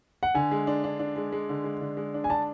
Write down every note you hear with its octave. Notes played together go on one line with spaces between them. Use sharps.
F#5
D3 G#5
G#3
D4
D4
D4
G#3
G#3
D3
G#3
D3
G#3
D4
G#5
D4 A5